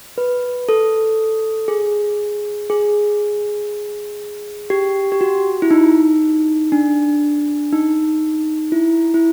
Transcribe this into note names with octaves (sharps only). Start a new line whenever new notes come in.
B4
A4
G#4
G#4
G4
G4
F#4
E4
D#4
D4
D#4
E4
E4